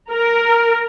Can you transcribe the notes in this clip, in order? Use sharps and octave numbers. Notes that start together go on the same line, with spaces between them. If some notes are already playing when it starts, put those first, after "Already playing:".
A#4